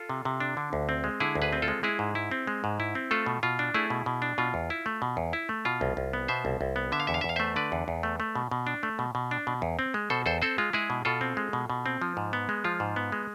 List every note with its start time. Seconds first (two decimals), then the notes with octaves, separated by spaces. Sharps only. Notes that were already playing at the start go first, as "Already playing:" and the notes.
Already playing: F4 A4
0.09 C3
0.25 C3
0.40 D4
0.57 D3
0.73 D2
0.89 C4
1.04 G#3
1.20 D3 E4 G#4
1.35 D2
1.42 G#4 B4
1.53 C4
1.62 F4 A4
1.68 G#3
1.83 G#3 E4 G#4
1.99 G#2
2.15 E4
2.31 C4
2.47 G#3
2.64 G#2
2.80 E4
2.95 C4
3.11 A3 F4 A4
3.26 B2
3.43 B2 F4
3.59 D4
3.74 A3 E4 G#4
3.90 B2
4.06 B2
4.22 D4
4.38 B2 F4
4.54 E2
4.70 E4
4.86 A3
5.02 B2
5.17 E2
5.33 E4
5.49 A3
5.65 B2 F4
5.81 C2
5.97 C2
6.13 B3
6.28 B2 C5 E5
6.45 C2
6.61 C2
6.76 B3
6.92 D3 E5
7.00 F5
7.07 E2 E5
7.14 F5
7.21 E5
7.24 E2 F5
7.36 A3 C5 E5
7.56 D3 B4 D5
7.72 E2
7.88 E2
8.03 A3
8.20 A3
8.35 B2
8.51 B2
8.67 D4
8.83 A3
8.99 B2
9.15 B2
9.31 D4
9.47 B2
9.62 E2
9.79 C4
9.94 G#3
10.10 B2 A4 C5
10.26 E2 A4 C5
10.42 C4 A4 C5
10.58 G#3 F4
10.73 G#3 E4 G#4
10.90 B2
11.05 B2 F4 A4
11.21 C4
11.37 G#3
11.53 B2
11.70 B2
11.86 C4
12.02 F3
12.17 G#2
12.33 B3
12.49 G#3
12.64 F3 F4
12.80 G#2
12.96 B3
13.12 G#3